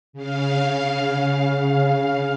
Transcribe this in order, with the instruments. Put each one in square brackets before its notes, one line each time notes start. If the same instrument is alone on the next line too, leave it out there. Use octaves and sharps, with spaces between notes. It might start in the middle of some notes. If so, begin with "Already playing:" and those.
[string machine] C#3 F5